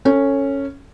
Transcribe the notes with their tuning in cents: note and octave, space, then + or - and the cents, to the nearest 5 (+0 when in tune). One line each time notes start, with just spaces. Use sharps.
C#4 -5 A4 +25